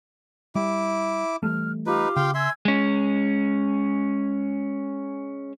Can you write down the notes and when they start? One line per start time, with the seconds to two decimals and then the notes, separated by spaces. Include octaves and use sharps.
0.55 G3 E4 D6
1.43 E3 G3 A3 F6
1.86 D#4 F4 G4 B4 D6
2.16 C#3 F5 G5 C6
2.34 E5 G#5 C6 E6 G#6
2.65 G#3 C#4